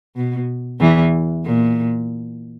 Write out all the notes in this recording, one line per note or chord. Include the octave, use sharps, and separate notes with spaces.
B2
E2 E3
A#2